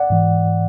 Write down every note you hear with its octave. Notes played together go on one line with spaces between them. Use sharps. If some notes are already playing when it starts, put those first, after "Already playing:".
Already playing: D5 F#5
G#2 E3